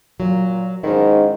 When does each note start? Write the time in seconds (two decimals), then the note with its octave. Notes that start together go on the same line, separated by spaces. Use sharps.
0.20 A#2 F#3
0.83 G#2 D#3 C#4 D4 E4